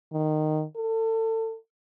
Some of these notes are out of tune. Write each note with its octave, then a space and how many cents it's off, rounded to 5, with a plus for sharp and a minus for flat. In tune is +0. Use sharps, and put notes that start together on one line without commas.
D#3 -15
A4 +30